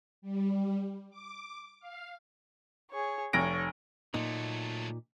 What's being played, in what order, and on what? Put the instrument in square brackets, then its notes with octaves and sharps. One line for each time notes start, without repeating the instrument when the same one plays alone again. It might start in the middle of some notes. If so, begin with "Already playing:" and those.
[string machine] G3
D6
F5
[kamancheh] G#4 C#5
[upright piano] F1 A#6 D7 [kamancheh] C#5
[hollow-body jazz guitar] A#2 D#4 [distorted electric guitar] F#3 A3